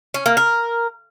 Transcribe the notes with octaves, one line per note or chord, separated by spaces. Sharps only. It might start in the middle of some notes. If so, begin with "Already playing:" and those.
C#4
A#3
A#4